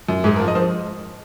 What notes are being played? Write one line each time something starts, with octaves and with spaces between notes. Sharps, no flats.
F#2
G#2 G#4
F3 A#4
D#5
F3 C5